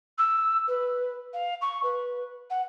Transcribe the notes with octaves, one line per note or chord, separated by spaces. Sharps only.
E6
B4
F5
C#6
B4
F#5